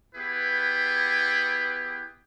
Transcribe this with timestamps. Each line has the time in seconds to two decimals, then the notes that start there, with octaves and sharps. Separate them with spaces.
0.15 B3 E4 G4 G#4 B4